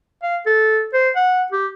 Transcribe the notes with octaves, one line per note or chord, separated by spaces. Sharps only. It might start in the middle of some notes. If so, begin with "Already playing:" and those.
F5
A4
C5
F#5
G4